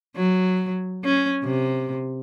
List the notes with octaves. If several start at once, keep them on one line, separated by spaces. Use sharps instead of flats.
F#3
C#4
C3